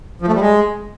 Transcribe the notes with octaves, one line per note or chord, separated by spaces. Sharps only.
F3
A3
G3
G#3